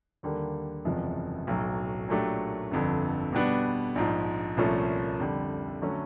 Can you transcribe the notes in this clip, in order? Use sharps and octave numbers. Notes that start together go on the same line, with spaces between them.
D#2 D3 G3 A#3
F#1 E2 C3 F3 G#3
B1 A2 F#3
A#2 F#3 A3 D4 G4
G1 F2 D3
B2 G3 B3 D4
A#1 G#2 F3
C2 A#2 F3 A3 C#4
F2 D3 G3
D3 F#3 A3 C#4